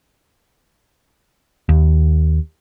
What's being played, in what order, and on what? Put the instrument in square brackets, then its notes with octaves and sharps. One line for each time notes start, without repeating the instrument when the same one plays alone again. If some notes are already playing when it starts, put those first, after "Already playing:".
[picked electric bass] D#2